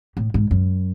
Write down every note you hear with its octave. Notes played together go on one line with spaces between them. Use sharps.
A2
G#2
F#2